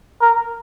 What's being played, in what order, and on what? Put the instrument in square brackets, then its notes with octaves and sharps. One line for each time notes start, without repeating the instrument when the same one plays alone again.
[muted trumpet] A#4